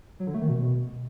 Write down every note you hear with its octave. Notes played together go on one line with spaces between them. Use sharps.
F#3
D3
A3
D#3
B2